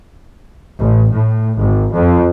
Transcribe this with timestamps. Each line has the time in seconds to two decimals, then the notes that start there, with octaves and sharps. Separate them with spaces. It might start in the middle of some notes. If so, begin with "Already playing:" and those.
0.78 A1
1.10 A2
1.59 G#1
1.93 F2